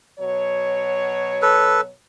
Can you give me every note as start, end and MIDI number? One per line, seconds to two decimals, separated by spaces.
0.19 1.90 47
0.19 1.90 54
0.19 1.90 73
1.42 1.81 69
1.42 1.81 71